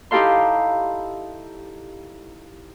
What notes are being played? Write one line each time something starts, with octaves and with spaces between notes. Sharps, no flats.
D#4 E4 G4 A4 F5 C6